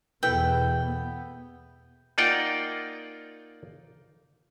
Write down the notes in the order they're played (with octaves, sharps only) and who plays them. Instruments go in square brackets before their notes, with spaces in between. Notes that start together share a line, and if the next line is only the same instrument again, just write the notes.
[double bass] E2 B2 [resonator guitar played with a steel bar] E4 A4 B4 [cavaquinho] G5
[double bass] B3
[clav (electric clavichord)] A#3 D#4 F4 D5 F#5 G5